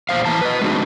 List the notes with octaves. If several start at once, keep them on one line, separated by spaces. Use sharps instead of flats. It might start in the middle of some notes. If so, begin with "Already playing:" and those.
E2 A#2 B3 C5 F5
E3 E4 A5 A#5
B4 D#5
G#3 A3 C4 D4 D#4 F#4